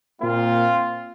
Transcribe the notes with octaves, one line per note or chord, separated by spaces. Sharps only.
A#2 A#3 C4 F4